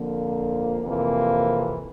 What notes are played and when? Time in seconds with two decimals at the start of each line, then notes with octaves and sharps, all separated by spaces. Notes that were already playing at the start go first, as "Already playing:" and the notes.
Already playing: F2 D3 F3 A#3
0.83 F2 C3 E3 A#3